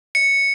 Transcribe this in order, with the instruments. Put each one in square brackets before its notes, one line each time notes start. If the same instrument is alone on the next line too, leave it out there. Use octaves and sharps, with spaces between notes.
[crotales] C#7